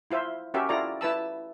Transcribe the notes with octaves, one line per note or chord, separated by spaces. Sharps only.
E4 F4 C5 E5
C#4 F#4 G4 A#4 E5
E4 F4 A4 D5 A#5
E4 B4 A5 E6